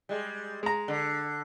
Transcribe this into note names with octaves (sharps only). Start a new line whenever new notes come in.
G3 G#3
G#3 A#5
D3